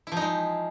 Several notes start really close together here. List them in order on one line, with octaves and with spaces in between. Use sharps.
E4 F3 D#4 G#3